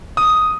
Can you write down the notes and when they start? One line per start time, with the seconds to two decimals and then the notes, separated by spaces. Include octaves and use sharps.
0.17 D#6